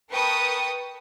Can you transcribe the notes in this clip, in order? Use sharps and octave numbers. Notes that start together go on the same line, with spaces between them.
A#4 B4 G5 A5 C#6 D#6